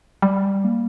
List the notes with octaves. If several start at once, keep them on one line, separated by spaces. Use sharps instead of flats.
G3
A#3